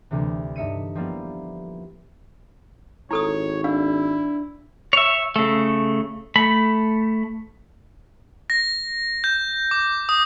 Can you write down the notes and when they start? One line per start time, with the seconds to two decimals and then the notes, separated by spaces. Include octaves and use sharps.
0.11 D2 C3 E3
0.56 G2 D#4 E5 C#7 D#7
0.95 F3 G3 A#3 B3 E4
3.11 G#1 E4 A4 C#5 D#6
3.64 D4 E4 F5
4.93 C#5 E5
5.36 C#3 A3
6.36 A3 B5
8.50 A#6
9.24 G6
9.71 D6
10.09 D#6